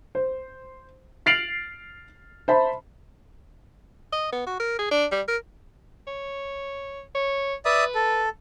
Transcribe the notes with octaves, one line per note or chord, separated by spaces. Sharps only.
C5
F6 A6 C7 D7 F7 F#7
C5 E5 A5 B5
D#5
B3
F#4
A#4
G#4
D4
G3
A#4
C#5
C#5
B4 D5 E5 D#6
A4